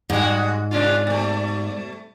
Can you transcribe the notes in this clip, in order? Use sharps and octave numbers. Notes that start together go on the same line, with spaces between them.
G#2 G3 G#3 F#4
C3 D4 F4 D5
B2 A3